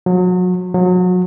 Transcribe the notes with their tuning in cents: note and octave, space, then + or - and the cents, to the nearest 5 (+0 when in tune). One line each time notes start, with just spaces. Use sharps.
F#3 -30
F#3 -30